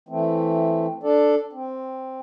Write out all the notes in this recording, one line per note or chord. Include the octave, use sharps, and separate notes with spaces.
E3 A3 C4
D4 A4 D5
C4